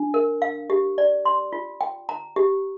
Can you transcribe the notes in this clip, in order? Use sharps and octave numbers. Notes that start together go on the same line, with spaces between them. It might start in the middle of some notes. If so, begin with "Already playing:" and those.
Already playing: D4
A#4
F5
G4
D5
C6
F4
G5
A#5
G4